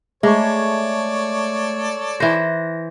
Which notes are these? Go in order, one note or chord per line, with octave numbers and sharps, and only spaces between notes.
G#3 A3 A4 C#5 D5 A5 C#6
E3 C5 A#6